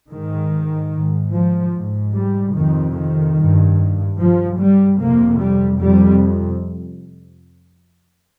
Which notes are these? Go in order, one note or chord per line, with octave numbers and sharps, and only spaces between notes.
G#2 D#3
G#2
F3
G#2
G3
F2 C3 D#3
D#3
G2
G2 F3
G3
F2 C3 A#3
G3
F2 C3 G3